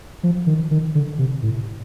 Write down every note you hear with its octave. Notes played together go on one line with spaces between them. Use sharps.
F3
D#3
D#3
D3
C3
A2